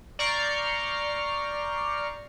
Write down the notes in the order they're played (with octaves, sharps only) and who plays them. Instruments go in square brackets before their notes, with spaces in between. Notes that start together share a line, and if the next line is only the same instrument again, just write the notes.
[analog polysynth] D5 A#5 C#6 F6 G6 C7